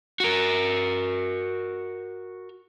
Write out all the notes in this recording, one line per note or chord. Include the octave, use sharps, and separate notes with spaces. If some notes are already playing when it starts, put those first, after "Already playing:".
F#4 A#4